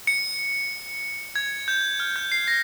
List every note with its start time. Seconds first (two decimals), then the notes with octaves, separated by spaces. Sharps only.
0.07 C#7
1.36 G#6
1.68 G6
2.00 F6
2.16 G6
2.32 C7
2.48 A#6